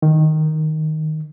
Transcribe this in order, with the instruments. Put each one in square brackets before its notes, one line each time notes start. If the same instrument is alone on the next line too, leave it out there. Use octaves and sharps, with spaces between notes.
[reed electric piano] D#3